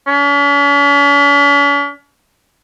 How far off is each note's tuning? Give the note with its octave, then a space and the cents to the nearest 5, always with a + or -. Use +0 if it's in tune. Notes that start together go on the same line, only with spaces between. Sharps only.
C#4 +45